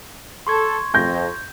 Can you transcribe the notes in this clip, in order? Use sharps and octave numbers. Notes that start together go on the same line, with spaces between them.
A4 C6 C#6 G#6
F2 G6 A#6